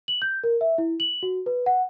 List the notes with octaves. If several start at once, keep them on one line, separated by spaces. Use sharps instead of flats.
F#7
G6
A#4
E5
E4
F#7
F#4
B4
F#5